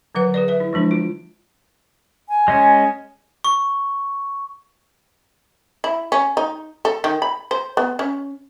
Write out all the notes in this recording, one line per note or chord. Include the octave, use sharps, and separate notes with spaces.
D3 F#3 B4 F#5
G#4 B4 D5
B4 E5
E4
F3 G#3 D4 E4
F4
G#5
G#3 C#4
C#6
E4
C#4
D#4
A4
D#3
B5
C5
B3
C#4